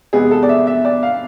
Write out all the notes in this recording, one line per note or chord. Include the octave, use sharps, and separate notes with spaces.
E2 C3 G#3 B3 G#4
A4
D5
E5
E5
D5
F5